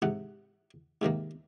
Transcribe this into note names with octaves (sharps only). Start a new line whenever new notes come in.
G#2 C3 F#5
G#2 C3 D#3 A#3